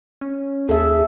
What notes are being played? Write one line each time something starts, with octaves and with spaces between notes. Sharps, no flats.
C#4
D#2 G#4 A4 E5